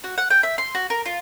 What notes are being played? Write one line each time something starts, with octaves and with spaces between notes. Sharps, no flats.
F#4
F#5
G5
E5
C6
F#4
A#4
F4